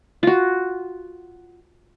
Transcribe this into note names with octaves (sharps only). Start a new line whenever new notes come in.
F4 F#4